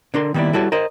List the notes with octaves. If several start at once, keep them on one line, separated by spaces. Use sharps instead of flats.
D3 D4 A#4 C6
D#3 G3 A#3 B3 E4 D5
G3 E4 F#4 A4 B4 C#5
A#4 C5 D#5